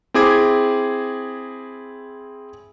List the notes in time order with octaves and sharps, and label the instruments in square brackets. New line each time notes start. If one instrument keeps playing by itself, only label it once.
[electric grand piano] C4 E4 G#4 D6 G#6